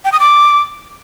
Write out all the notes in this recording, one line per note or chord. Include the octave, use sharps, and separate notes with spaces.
G5
D#6
D6